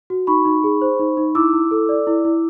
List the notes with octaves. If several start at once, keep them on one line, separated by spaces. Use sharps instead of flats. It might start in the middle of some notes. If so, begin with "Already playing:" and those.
F#4
D#4 B5 C#6
D#4
G#4
C5
D#4
D#4
E4 D6 E6
E4
A4
D5
E4
E4